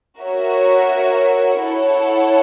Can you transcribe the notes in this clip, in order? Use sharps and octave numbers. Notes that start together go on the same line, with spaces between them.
F#4 A#4 C#5 E5
E4 A4 C#5 F#5